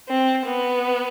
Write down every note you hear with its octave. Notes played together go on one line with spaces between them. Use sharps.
C4
B3